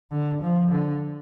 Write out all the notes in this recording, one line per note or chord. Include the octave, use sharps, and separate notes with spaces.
D3
F3
D3